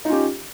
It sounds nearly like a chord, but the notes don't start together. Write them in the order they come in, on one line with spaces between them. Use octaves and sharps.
D#4 F4 C#4 G4